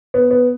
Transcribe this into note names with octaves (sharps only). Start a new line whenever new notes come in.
B3
B3